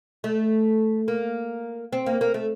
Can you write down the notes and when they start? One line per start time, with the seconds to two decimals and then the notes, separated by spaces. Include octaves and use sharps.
0.24 A3
1.08 A#3
1.93 C4
2.06 A#3
2.21 A#3
2.34 A3